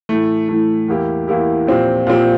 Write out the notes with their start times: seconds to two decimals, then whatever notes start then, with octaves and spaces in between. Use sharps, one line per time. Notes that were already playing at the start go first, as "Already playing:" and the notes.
0.09 A2 E3 A3
0.49 A2 E3 A3
0.88 E2 E3 A#3 E4 G4
1.28 E2 E3 A#3 E4 G4
1.67 A#2 F3 C4 G4
2.07 A#2 F3 C4 G4